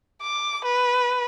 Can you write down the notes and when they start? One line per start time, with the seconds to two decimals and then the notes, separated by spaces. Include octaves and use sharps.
0.22 D6
0.65 B4